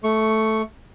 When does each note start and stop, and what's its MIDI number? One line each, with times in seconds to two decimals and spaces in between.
0.04 0.62 57
0.04 0.62 85